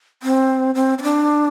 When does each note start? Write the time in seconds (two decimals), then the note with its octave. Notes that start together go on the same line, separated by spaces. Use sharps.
0.23 C4
0.75 C4
0.98 C4
1.03 D4